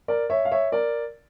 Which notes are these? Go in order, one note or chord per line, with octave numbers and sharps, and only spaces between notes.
A#4 D5
C#5 E5
F5
C#5 E5
A#4 D5